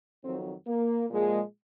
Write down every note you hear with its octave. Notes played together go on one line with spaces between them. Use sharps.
F2 D#3 F#3 C4
A#3
A#2 F3 G#3